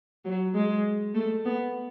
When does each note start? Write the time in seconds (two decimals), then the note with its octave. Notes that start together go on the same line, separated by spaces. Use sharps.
0.25 F#3
0.54 G#3
1.14 A3
1.45 B3